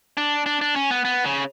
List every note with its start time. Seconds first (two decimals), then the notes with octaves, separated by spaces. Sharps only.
0.17 D4
0.46 D4
0.61 D4
0.76 C#4
0.91 B3
1.05 B3
1.25 C#3